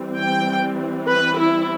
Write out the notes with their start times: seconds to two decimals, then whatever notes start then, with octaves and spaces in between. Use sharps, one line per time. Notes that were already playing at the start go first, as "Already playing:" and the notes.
Already playing: E3 G3 C4
0.18 G5
1.09 B4
1.40 E4